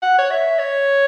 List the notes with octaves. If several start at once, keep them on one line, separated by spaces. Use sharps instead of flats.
F#5
C#5
E5
C#5